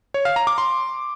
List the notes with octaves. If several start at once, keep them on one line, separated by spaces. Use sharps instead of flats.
C#5
F5
A#5
D6
C6